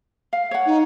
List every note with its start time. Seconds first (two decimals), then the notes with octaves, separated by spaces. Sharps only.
0.33 F5
0.51 C#5 F#5
0.66 D#4